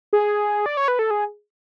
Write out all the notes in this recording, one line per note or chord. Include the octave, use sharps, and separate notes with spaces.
G#4
D5
C#5
B4
A4
G#4